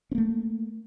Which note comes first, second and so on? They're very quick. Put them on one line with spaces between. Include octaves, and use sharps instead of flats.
C#4 A#3 A3